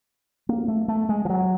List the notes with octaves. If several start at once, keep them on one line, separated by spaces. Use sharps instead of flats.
A#3
A3
A3
G#3
F3
F#3